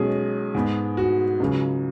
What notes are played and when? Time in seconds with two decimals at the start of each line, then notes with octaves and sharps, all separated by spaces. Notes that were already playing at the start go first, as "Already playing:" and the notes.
Already playing: B1 B2 G#3 C#4 G#4
0.55 G#2 G#3 B3
0.97 F#4
1.40 C#2 C#3 F#3